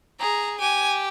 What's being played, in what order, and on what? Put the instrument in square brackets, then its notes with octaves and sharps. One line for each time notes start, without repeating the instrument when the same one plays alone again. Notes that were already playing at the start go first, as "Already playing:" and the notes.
[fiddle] G#4 [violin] A#5
[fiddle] G4 [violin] G#5